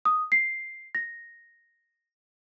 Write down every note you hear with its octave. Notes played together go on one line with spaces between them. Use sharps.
D#6
C7
A#6